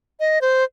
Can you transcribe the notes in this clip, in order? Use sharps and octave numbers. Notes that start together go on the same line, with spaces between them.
D#5
C5